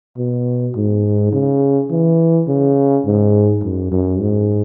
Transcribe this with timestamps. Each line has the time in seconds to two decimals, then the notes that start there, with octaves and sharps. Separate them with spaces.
0.17 B2
0.76 G#2
1.33 C#3
1.91 E3
2.48 C#3
3.06 G#2
3.63 F#2
3.91 F#2
4.20 G#2